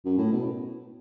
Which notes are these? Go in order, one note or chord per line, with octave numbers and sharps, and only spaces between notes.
F#2
A2
B2